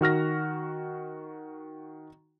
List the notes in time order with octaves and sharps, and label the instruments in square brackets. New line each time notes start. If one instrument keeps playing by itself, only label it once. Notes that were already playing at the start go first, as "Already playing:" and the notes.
[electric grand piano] D#3 F#4 F6 A#6